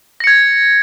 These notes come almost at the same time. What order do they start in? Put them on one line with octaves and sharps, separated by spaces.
A#6 C#7 G#6